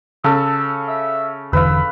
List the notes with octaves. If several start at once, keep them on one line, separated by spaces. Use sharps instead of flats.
C#3 A4 E6
E5
E1 D3 E3 B4 F5 E6